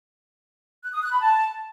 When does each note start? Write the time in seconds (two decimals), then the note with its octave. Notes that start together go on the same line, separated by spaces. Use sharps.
0.83 F#6
0.92 D#6
1.02 F#6
1.11 B5
1.21 A5